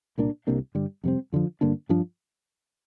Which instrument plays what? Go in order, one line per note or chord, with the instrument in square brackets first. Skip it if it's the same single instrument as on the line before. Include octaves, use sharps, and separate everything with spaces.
[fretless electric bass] C2 A#2 A#3 D4
C2 C3 A#3 D4
G2 D3 G3
F2 C3 G3 C4
F2 D3 F3
G2 D3 A#3 D4
G2 F3 D4